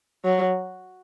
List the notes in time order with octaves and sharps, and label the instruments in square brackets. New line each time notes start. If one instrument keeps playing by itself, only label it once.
[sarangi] F#3